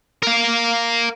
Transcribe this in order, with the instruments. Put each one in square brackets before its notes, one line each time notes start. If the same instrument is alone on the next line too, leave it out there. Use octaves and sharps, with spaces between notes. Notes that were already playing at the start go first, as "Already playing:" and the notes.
[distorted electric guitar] A#4 F5